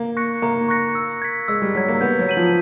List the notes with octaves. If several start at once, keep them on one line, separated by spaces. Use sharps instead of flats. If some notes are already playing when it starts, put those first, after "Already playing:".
Already playing: A#3
C#6 F#6 A#6 C#7
A#3 A#5
C#6 F#6 A#6 C#7
E6
G#6 B6
G#3 E6
G3
F#3 G#6 B6
A#3
B3 G6
F#3
B6 D#7 F#7
F3